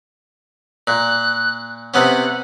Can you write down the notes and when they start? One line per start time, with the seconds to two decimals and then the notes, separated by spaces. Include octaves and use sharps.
0.87 A#2 F#6
1.94 C3 B3 C#4 F#5